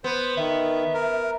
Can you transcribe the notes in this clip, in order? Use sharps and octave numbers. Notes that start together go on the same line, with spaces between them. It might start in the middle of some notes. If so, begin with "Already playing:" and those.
B3 C5
D#3 E5
A#4